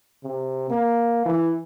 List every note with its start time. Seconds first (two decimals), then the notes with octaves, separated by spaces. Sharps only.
0.24 C3
0.70 A#3
1.25 E3